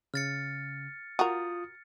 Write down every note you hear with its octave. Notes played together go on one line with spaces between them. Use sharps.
C#3 F6 A6 C#7
F4 F#4 A#4 D#6